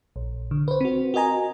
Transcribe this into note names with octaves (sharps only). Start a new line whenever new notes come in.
A#1
D3
B4 C5
C4 F#4
F#4 A#4 D#5 G#5 A#5